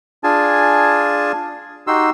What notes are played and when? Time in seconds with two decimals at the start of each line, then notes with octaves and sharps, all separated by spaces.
0.24 D4 F4 G#4 G#5 A5
1.87 D#4 F#4 G4 C6 E6